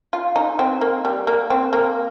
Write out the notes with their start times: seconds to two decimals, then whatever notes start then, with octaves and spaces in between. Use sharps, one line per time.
0.13 F4
0.36 D#4
0.59 C4
0.81 A#3
1.05 G3
1.27 A#3
1.50 C4
1.73 A#3